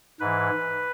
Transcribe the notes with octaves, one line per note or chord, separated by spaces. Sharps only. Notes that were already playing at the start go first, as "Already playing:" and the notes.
G#2 E3 B4